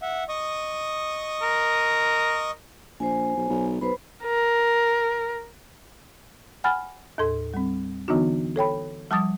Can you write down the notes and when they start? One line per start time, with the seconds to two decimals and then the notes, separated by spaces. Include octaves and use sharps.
0.02 E5 F#5
0.29 D#5 C#6 D#6
1.42 A#4
3.00 A#1 C5 G#5
3.37 B1
3.49 B1
3.81 B1 B4 C5 B5
4.23 A#4
6.64 F#5 G#5 B5 F6 A6
7.18 D#2 A2 A4 C6
7.54 G3 C4
8.08 D3 E3 B3 D4 D#4 F#4
8.56 A4 C#5 G5 B5
9.11 F3 G3 A5 D6 D#6 A6